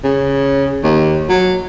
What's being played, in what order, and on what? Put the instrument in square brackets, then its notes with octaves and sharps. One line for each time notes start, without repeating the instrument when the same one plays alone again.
[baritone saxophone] C#3
D#2
F#3